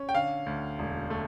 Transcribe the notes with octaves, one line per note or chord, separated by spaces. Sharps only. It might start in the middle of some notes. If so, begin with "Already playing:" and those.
Already playing: C#4
G5
D3 F5
D2
E1
A3